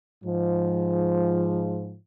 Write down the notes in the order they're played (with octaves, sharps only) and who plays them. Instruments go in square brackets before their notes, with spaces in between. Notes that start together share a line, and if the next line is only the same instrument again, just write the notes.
[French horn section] G#2 F3